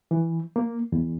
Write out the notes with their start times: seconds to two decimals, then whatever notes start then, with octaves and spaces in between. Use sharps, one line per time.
0.11 E3
0.56 A#3
0.92 E2